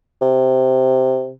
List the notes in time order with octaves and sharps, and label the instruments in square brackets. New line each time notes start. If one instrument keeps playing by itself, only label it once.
[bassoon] C3